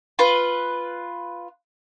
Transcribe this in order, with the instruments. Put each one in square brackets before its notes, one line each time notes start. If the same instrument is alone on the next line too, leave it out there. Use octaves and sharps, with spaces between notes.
[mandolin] F4 B4